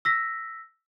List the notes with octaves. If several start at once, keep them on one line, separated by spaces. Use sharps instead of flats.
E6 A#6 B6